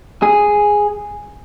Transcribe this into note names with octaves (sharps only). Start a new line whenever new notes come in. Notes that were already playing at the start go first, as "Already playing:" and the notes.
G#4